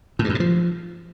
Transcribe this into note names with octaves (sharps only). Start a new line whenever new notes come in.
A2
G2
F#2
B2
F3